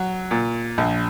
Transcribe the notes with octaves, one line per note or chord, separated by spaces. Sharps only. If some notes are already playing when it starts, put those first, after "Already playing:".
Already playing: F#3
A#2
A#1